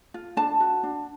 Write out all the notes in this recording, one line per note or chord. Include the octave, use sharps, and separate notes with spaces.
F4
D4 A5
F#4
D4